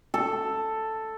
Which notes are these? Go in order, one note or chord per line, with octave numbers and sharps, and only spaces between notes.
A4